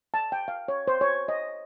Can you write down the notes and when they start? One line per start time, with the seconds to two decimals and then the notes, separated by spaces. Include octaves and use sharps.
0.14 A5
0.32 G5
0.48 F5
0.68 C#5
0.87 C5
1.01 C#5
1.28 D#5